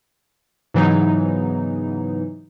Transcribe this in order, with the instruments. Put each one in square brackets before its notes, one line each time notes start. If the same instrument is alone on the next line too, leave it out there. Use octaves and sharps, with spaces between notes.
[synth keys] G#2 C#3 E3 F#3 B3 D#4